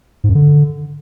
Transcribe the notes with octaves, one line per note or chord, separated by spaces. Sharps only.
G#2
F#2
D3